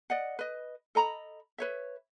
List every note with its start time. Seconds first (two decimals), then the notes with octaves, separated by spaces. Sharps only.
0.10 D5 D#5 F#5
0.39 B4 D#5
0.95 A4 D#5 A#5 B5
1.58 B4 C#5 E5